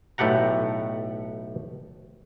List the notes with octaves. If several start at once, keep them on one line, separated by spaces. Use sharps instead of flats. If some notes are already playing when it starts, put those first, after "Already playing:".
B1 A2 A3 G4 F#5 A#5